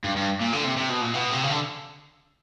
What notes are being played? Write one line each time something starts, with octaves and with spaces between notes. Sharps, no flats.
G2
G2
A#2
D3
C3
C3
B2
A#2
B2
C3
C#3
D3